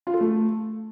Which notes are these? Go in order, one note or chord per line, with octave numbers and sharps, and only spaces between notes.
F4
A4
A3